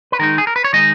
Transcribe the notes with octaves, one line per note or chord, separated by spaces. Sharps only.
B4
D#3 G#3 D#4 A#4
G#4
A#4
B4
C#5
D#3 G#3 D#4 D#5